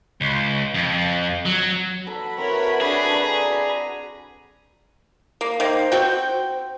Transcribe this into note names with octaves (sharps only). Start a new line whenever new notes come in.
C#2
F2
F#3
F#4 A4 B4 A#5 B5
C4 E4 A#4 C#5
D4 G#4 A4
D5 A#5
A#3
D#3 A#3 C5
C4 F#4 G5